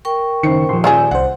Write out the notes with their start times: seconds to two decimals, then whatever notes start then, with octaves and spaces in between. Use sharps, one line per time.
0.05 A#4 G5 C#6
0.43 F#1 D#3 C5 C#7
0.69 D#1 F3 C6
0.84 C#4 F4 G#4 D5 E6 G6
1.11 C2 C5 F#5